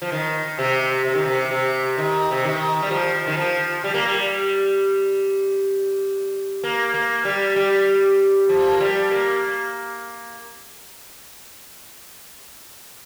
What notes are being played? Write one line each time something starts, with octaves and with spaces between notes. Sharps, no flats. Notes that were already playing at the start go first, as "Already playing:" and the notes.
F3
D#3
C3
C3
D#3
C3
C3
D#3
C3
D#3
G3
F3
D#3
F3
G3
A#3
G3
A#3
A#3
G3
G3
F3
A#3
G3
A#3